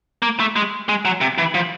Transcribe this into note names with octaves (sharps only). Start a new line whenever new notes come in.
A#3
A3
G#3
G#3
F#3
C3
E3
F3